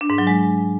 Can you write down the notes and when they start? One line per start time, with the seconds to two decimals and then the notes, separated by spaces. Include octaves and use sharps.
0.01 D4
0.10 G#2
0.18 F#3
0.27 G#3